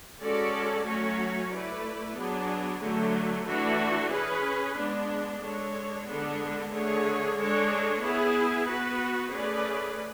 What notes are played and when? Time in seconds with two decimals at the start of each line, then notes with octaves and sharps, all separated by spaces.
0.20 G#3 C#4 F#4 A4 D5
0.85 F#3 A3 C#4 F#4 C#5
1.51 A3 E4 B4 D5
2.15 F#3 B3 D4 G#4
2.80 D3 F#3 A3
3.46 E3 A3 D4 F#4
4.10 C#4 G#4 B4
4.76 G#3 B3 D4
5.41 G#3 D4 A4 C#5
6.06 D3 G#3 B3 D4 A4
6.72 D3 A3 D4 G#4 C#5
7.37 G#3 D4 A4 C#5
8.01 B3 E4 G#4
8.67 B3 F#4 B4
9.31 A3 C#4 G#4 B4 D5